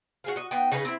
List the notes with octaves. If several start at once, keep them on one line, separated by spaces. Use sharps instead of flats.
F#4 G#4 F5
F#4 D#5
B3 D#4 G5
C#3 D#4 G#4 B4
C4 E4